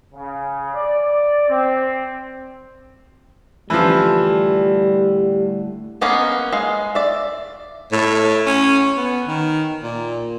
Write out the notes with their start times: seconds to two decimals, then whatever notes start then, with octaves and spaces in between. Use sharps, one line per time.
0.13 C#3
0.75 D5
1.48 C4
3.70 A2 D3 E3 F3 G3
6.01 G#3 A#3 B3 C#4
6.53 G#3 F5
6.95 D5 E5
7.92 A2
8.46 C#4
8.97 B3
9.27 D#3
9.83 A#2